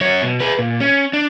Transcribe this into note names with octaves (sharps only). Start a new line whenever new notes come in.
F#2 C#5
B2
G#4 B4
A#2
C#4
D4